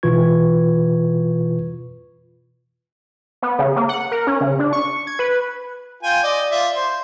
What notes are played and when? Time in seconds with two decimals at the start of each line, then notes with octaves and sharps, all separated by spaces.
0.03 B2 E3 F4 B4 C#6 G#6
3.42 B3
3.59 C#3
3.76 A#3
3.89 F#5
4.12 A#4
4.27 C#4
4.41 C#3
4.59 D4
4.73 C#6
5.07 G#6
5.19 B4
6.03 F4 G5 G#5
6.23 D5 D#5
6.51 F4 D5 E5
6.76 C5